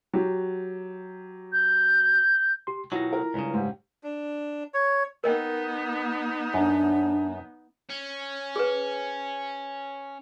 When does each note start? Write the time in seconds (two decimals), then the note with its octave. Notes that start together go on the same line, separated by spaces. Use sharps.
0.13 F#3 G4
1.52 G6
2.67 G4 C6
2.92 B2 D#3 F#3 E4 F4 A#6
3.13 A#4
3.34 C#2 G2 C#3
3.54 G#2 G4
4.04 D4
4.74 C#5
5.24 B3 D#4 A#4 D#5 G5
6.54 F#2 D4
7.90 C#4
8.56 G#4 B4